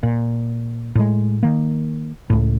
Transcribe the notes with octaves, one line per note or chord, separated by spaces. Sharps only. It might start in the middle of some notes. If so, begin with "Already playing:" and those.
A#2
A2 G#3
D#3 A#3
C#2 A2